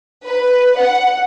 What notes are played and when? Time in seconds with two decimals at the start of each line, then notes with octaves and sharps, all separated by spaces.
0.24 B4
0.77 F#5